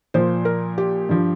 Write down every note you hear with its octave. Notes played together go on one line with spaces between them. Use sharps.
A#2 F3 C5
A#4
G4
G2 F3